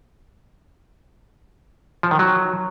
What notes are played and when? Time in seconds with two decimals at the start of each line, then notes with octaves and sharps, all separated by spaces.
2.03 F3
2.11 D#3
2.19 F#3